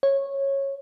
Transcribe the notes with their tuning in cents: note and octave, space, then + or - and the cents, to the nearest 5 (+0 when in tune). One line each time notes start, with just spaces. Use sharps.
C#5 -15